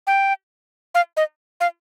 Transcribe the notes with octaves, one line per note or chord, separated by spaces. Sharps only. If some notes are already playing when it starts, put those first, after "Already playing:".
G5
F5
D#5
F5